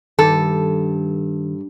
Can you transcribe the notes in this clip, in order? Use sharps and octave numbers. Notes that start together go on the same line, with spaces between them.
G2 D#3 A4